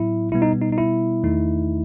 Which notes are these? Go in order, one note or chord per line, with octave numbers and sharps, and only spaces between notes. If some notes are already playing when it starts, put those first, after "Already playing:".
Already playing: A2 F#3 B3 E4
B2 G3 B3 E4
D#4
D#4
D#4
E4
E2 D#3 A3 D#4